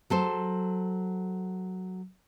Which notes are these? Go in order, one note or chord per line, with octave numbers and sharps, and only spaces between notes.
F#3 A4 C5